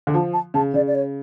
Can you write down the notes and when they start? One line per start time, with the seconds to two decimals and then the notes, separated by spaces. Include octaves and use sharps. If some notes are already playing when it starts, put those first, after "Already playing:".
0.07 D3
0.14 F3 A5
0.33 A5
0.54 C#3 A5
0.74 C#3 D5
0.87 D5
0.94 C#5